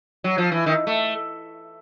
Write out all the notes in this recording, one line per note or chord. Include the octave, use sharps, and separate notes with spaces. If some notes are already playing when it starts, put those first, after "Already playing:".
F#3
F3
E3
D#3
A3